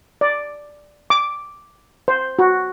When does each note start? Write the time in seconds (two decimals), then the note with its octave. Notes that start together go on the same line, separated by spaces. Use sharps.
0.21 D5
1.10 D6
2.08 C5
2.39 F#4